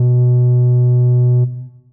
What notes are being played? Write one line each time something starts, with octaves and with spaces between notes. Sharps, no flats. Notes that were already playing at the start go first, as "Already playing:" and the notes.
Already playing: B2